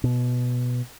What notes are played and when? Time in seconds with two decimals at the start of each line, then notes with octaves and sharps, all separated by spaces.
0.04 B2